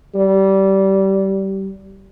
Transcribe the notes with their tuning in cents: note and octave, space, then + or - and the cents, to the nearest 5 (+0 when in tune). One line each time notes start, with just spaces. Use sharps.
G3 -20